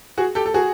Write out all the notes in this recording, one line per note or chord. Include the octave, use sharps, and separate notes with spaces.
F#4 G#4
G4 A4
A4
F#4 G#4